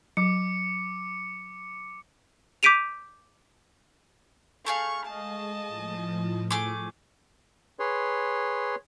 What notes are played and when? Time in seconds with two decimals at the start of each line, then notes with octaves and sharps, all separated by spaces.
0.17 F#3 D6 C#7
2.63 D6 G6 B6 D7 D#7 F7
4.66 A3 G#4 F5 C#6
5.06 G#3 D#5 A5
5.67 A2 F3
6.51 A3 G#4 D6
7.79 G#4 B4 C#5 C6